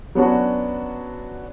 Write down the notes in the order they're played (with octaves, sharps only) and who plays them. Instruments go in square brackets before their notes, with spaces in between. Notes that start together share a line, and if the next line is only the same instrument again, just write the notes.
[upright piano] F#3 B3 C#4 D4 F#4